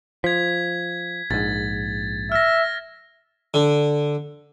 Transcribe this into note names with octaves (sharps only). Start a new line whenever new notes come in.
F3 G#6 B6
A#1 G#2 A6
E5 F6 A#6
D3